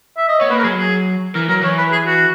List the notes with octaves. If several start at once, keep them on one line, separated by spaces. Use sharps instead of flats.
E5
D#5
B3 C#5
A#3 B4
A#4
F#3 G#4
G#4
E3 A#4
F#3 A#4
E3 C#5
B4
G#4
F#4